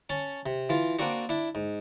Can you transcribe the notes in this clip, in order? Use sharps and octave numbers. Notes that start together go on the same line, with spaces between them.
C#4 A5
C3
E3 F4
A#3 C4 D4 F#4
D4 E4
G#2